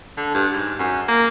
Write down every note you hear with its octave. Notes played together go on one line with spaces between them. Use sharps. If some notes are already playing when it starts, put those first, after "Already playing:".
D3
G2
G#2
F#2
A#3